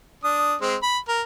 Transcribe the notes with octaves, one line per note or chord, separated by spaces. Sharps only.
D4 D#6
G#3 C4
B5
A#4